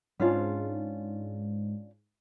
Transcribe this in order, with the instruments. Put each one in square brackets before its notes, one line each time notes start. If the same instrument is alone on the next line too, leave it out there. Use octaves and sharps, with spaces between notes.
[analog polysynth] G#2 [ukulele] C#4 D4 F4